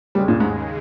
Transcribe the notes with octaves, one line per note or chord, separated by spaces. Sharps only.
D#2 C#3 G3 G#3
A#2
G#2